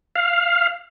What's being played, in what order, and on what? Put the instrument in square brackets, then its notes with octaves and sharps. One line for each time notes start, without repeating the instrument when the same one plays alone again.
[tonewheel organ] F5